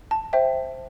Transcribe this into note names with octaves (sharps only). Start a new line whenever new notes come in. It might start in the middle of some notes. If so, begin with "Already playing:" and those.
A5
C5 E5 G5